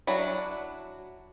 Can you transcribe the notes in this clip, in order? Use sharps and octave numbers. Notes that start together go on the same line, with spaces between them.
F#3 D4 E4 F#4 B5